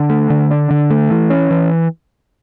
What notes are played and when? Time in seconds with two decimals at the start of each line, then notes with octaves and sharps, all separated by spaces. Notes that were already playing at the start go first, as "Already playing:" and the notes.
Already playing: D3
0.10 A3
0.30 D3
0.51 D4
0.70 D3
0.90 A3
1.11 E3
1.30 C#4
1.51 E3